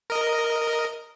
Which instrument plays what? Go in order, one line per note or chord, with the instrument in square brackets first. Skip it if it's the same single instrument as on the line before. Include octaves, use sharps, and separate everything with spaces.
[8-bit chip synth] A#4 D#5